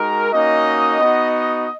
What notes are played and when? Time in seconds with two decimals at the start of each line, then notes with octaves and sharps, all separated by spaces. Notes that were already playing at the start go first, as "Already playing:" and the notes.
Already playing: G#3 D#4 F#4 A#4
0.32 A#3 C#4 D#4 F#4 D#5
1.00 B3 D#4 F#4